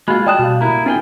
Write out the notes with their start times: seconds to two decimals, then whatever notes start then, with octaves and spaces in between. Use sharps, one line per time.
0.08 G#3 A#3 F4 F#4 B5
0.27 G3 D5 D#5 G5 A5 D#6 F#6 E7
0.39 B2 F#4 F5
0.61 A#3 E4 A#5
0.86 B3 C#4 D#4 F4 G#4 G5